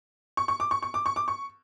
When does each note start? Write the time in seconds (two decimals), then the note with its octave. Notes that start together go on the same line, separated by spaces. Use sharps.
0.37 C#6
0.48 C#6
0.60 D6
0.71 C#6
0.82 C#6
0.94 D6
1.06 C#6
1.16 D6
1.28 C#6